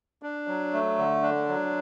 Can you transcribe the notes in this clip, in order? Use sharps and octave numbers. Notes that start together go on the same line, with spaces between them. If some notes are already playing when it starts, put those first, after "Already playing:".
D4
F#3
A3
D3
D4
F#3